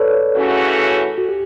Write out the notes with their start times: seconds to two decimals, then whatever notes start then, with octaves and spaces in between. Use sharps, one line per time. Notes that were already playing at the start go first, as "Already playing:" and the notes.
Already playing: A4 B4 C#5 D5
0.35 C#3 E3 A3 C#4 F#4
1.18 F#4
1.29 G4